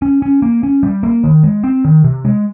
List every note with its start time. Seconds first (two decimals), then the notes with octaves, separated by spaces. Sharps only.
0.02 C#4
0.22 C#4
0.42 A#3
0.63 C#4
0.83 G3
1.03 A#3
1.24 D#3
1.43 G#3
1.64 C4
1.85 D#3
2.04 C3
2.25 G#3